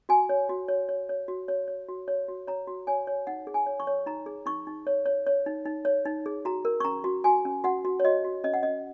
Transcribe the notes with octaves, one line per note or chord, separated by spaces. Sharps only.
F#4 G#5
C#5
F#4
C#5
C#5
C#5
F#4
C#5
C#5
F#4
C#5
F#4
C#5 A#5
F#4
C#5 G#5
C#5
D#4 F#5
G#4
G#5
C#5
C#6
C#5
D#4 A#5
G#4
D#4 C#6
D#4
C#5
C#5
C#5
D#4
D#4
C#5
D#4
G#4
F#4 A#5
A#4
C#6
C#4 A#5
F#4
F#4 G#5
C#4
F#4 F#5
F#4
C#5
F#4 D#5
F#4
C#4 D#5
F#5
C#4 D#5